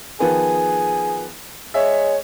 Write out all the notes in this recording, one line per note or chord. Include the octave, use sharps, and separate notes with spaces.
D#3 F3 B3 G#4
G#3 C#5 E5